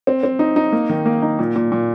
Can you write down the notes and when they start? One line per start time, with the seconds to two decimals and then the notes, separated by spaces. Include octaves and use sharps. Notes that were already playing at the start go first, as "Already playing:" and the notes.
0.07 C4
0.23 C4
0.39 D#4
0.56 D#4
0.72 A#3
0.89 D#3
1.06 A#3
1.22 D#4
1.39 A#2
1.56 A#2
1.72 A#2